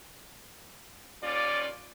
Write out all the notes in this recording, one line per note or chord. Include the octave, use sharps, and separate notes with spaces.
D#2 C#4 F4 D5